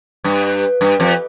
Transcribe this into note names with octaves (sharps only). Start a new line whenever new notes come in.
G2
G2
F2